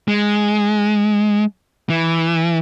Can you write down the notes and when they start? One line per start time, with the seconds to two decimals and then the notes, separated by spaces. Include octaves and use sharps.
0.08 G#3
1.89 E3